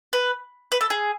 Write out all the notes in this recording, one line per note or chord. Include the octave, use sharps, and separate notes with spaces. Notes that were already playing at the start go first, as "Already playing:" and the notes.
B4
B4
A4
G#4